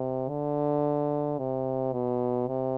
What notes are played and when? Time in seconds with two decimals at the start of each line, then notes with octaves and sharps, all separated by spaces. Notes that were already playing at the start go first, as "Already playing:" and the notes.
Already playing: C3
0.29 D3
1.38 C3
1.92 B2
2.48 C3